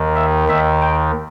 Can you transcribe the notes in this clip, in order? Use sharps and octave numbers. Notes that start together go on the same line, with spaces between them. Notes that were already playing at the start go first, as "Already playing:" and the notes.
Already playing: D#2 D#3
E5
D#2 D#3 E5
G5